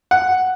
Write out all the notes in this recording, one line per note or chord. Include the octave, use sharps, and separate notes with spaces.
F#5